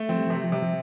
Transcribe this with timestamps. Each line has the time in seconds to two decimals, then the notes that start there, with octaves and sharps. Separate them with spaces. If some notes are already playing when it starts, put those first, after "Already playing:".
Already playing: A3
0.09 F3 C4
0.17 G3
0.27 C3 F3
0.35 G3
0.44 F3
0.52 C3 G3
0.62 F3